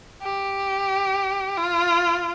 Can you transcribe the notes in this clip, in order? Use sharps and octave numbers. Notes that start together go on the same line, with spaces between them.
G4
F4